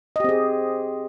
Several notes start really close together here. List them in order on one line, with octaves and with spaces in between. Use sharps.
D#5 G4 C4 G#4